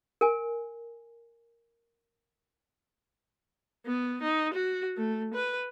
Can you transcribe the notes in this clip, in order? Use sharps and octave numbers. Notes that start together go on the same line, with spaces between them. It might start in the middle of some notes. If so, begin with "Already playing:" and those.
A#4 G#5
B3
D#4
F#4
A3
B4